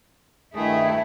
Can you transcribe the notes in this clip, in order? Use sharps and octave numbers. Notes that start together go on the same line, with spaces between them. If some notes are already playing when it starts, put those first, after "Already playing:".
G2 D#3 A3 E4 G#4